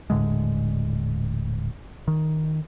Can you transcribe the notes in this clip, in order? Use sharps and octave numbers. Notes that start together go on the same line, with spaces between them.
D#1 A2 D3 G#3
D#3